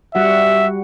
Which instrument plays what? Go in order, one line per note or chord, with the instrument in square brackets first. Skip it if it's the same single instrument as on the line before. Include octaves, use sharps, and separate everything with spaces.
[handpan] G3 F#4 F#5 [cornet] E5